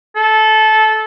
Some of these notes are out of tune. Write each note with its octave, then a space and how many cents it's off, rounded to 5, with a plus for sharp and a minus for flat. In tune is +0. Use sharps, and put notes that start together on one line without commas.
A4 -20